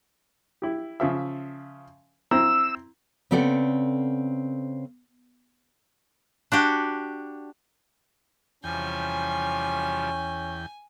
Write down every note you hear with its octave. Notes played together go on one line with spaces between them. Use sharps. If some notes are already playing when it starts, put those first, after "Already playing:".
E4 G4
C#3 F3 E5
C4 E4 A#5 E6
C#3 B3 C4 A4 D5 F#5
D4 F#4 G4
E2 C3 F3 G3 C#4 G5 G#5